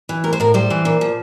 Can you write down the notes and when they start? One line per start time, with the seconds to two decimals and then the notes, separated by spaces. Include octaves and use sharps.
0.09 E3
0.24 A2 A#4
0.33 C5
0.40 A2 A#4
0.54 G3 C5
0.70 E3
0.85 A#2
1.01 F3